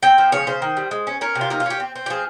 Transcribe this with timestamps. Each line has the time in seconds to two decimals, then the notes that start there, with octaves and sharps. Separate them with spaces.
0.03 C4 G5
0.18 F3
0.32 C#3 C#5
0.47 C#3 C5
0.62 D#3
0.77 G3
0.91 G#3
1.07 C#4
1.21 C#4 A#4
1.35 C3
1.41 F4
1.50 A#3 D#4
1.60 F4
1.66 C#4 G4
1.80 C4
1.95 C4
2.06 G4
2.10 F3 G#4